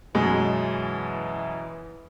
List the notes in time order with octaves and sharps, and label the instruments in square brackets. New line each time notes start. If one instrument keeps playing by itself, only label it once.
[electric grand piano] F#2 B2 [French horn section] E3 [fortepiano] G#3